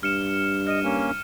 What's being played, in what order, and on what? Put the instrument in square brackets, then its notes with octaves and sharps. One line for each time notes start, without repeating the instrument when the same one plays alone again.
[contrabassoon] G2 [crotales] F6 C#7 E7
[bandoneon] D#5 [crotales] F6 D#7
[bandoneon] A#3 C#4